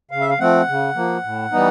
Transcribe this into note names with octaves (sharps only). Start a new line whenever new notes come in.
C#3 F5
E5
F5
F3 A3 C4 F#5
C#3
F3 A#3
A2
E3 G3 B3 D#4